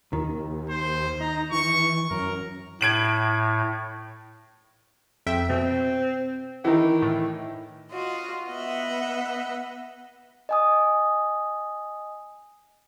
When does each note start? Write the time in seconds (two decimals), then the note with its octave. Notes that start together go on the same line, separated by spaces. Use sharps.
0.13 D#2 D#3
0.69 C5
1.21 D#4 A#5
1.52 E3 C#6
2.11 F#2 A#4
2.81 A2 G#6 D7 F#7
5.26 F2 E5 G5
5.50 B2 C4
6.65 D#3 E3 G5
7.02 A2 A3
7.91 F4 F#4 D#5
8.49 B3 D#5 E5 F#5
10.49 D#5 G#5 D#6